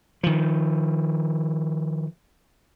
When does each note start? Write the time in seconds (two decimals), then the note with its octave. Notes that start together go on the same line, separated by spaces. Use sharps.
0.23 D#3 F3